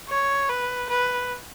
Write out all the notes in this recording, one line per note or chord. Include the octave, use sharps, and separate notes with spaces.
C#5
B4
B4